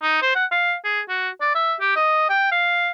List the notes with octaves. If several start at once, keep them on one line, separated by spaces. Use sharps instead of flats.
D#4
C5
F#5
F5
G#4
F#4
D5
E5
G4
D#5
G5
F5